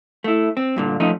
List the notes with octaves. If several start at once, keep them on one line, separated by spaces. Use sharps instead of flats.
A3 E4
C4
G2 A#2 D3
F3 A3 C#4 D#4